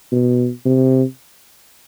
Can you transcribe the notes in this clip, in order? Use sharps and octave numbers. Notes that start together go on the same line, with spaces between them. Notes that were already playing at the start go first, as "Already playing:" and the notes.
B2
C3